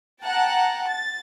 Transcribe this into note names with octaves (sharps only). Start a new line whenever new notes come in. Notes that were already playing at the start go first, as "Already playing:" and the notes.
F#5 G5 A5 A#5
A6